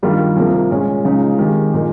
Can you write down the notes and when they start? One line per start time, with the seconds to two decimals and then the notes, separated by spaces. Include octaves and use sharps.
0.03 G2 D#3 G3 A#3 F4
0.36 C2 C3 F3 A#3
0.71 A#2 G#3 C#4
1.05 C#2 C#3 F3 G#3 D#4
1.39 D#3 G#3 C4 G4
1.73 A#2 G#3 D#4 A#4 D#5